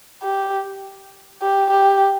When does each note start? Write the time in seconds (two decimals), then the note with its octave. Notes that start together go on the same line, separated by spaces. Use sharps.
0.23 G4
1.42 G4
1.71 G4